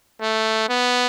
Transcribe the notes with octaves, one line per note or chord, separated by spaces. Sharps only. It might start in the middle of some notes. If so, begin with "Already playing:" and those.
A3
B3